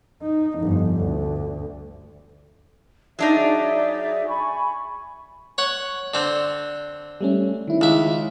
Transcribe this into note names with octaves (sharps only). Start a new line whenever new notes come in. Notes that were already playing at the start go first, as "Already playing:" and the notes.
D#4
G1 F2
D2
F#3 D4 D#4 G#4 D5 E5
G#5 B5 C#6
C#5 F#5
D3 C4
G3 A3 C#4
D#3 E4
C#2 E5